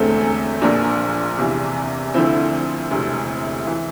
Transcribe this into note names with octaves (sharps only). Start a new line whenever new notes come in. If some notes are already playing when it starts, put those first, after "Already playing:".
Already playing: E1 E2 D3 A3 C4
A#1 A#2 F3 A#3 D4
E2 C3 E3
D2 D3 F3 C4 E4
E1 D2 C3
E3